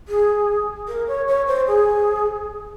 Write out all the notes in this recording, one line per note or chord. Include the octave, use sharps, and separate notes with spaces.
G#4
A#4
C#5
C#5
C5
G#4